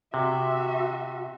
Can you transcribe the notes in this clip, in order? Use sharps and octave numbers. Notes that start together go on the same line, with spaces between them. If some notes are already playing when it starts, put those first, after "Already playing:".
C3 F#4 E5